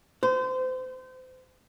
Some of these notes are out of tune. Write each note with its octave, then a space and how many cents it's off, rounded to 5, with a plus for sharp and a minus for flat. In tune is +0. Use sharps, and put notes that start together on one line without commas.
C5 -30